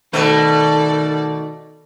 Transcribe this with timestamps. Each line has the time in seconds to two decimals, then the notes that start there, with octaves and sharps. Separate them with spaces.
0.13 B2 D#3 A3 A4 B4 D5